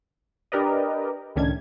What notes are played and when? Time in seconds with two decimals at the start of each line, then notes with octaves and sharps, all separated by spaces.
0.52 D4 G4 A#4 B4 D5 D#5
1.36 C#2 A2 D#3 C#4 D4 G#6